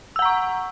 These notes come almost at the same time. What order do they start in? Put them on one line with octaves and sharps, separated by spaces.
E6 F#5 A#5 C#6